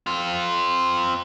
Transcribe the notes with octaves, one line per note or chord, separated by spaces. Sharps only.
C4 F4